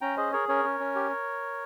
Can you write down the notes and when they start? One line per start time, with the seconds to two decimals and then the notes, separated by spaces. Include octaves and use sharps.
0.01 C#4 G5 A#5
0.17 G#4 C5 D#5
0.33 G#4 A#4 C#5
0.49 C#4 A#4 C#5
0.64 C#4
0.80 C#4
0.95 G4